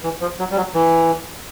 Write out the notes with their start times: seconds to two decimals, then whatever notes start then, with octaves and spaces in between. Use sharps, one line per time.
0.04 E3
0.21 F3
0.39 F#3
0.51 G3
0.57 F#3
0.74 E3